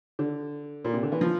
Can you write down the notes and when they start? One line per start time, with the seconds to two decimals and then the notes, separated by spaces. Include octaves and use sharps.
0.19 D3
0.85 A#2
0.94 C3
1.03 D3
1.12 E3
1.21 F3